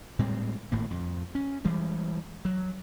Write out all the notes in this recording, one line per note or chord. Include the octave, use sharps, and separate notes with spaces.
A2 G3 G#3 C4
G#1 A2 A#3
F2
C#4
E3 G3 G#3
F#3